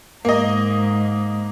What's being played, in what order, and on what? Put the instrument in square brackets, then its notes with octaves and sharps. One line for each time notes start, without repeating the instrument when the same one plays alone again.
[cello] G#2 [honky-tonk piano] A#3 D#5